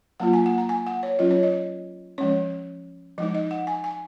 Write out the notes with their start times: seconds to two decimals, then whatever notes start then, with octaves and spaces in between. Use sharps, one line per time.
0.20 F#3 A#3 F4 F#5
0.33 G#5
0.46 F#5
0.58 A#5
0.69 G#5
0.87 F#5
1.03 C#5
1.19 F#3 C#4 F4 D#5
1.31 C#5
1.43 D#5
2.18 F3 G#3 C#4 C#5
3.18 F3 G#3 D#4 D#5
3.35 D#5
3.51 F#5
3.67 G#5
3.84 G#5